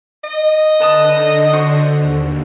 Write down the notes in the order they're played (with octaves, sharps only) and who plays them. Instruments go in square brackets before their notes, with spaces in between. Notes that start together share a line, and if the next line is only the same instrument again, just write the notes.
[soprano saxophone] D#5
[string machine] D3 [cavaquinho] B4 A5 D#6
[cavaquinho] D#4
F#4 C5 C#6
[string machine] D#2